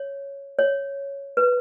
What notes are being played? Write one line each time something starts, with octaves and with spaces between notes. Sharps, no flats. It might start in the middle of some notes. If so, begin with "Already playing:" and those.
Already playing: C#5
C#5
B4